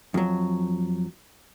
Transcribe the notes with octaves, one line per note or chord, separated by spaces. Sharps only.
F2 F#3